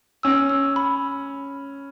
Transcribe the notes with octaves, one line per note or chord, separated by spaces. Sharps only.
C#4 E6
E6
B5